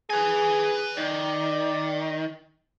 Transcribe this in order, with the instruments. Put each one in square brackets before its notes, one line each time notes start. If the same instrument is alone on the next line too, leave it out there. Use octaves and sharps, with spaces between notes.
[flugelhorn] G#4 [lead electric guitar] B4 G#5
[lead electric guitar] D#3 [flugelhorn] D5